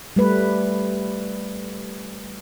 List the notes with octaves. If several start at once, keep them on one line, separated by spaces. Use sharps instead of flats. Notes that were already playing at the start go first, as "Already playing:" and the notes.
G3 A3 B4